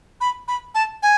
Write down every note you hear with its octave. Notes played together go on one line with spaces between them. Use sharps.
B5
B5
A5
G#5